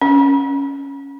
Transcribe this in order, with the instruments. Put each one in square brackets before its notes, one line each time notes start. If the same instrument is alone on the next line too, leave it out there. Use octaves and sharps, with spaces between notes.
[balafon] C#4